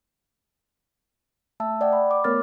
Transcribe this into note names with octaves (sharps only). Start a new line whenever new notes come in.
A3 E5 A5 E6
D5 D#5 F#5 G5
B5
D6
A3 B3 A#4 C#5 F6 A6